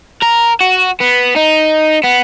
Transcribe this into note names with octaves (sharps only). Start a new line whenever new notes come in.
A#4
F#4
B3
D#4
B3